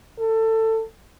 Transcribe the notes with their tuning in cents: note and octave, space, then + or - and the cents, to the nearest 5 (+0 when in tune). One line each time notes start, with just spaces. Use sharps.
A4 +20